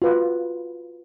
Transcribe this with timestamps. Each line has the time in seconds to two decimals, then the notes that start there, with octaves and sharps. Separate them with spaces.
0.02 F4 F#4 B4